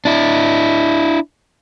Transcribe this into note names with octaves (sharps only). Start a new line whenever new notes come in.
D4 E4